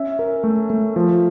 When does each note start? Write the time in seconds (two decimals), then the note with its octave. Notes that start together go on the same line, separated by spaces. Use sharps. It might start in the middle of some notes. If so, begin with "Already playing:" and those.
Already playing: C#4 E5
0.19 A#4
0.44 A3
0.70 A3
0.96 F3